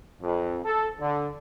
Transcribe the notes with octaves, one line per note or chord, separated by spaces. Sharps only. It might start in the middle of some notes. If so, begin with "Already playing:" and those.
F2
A4
D3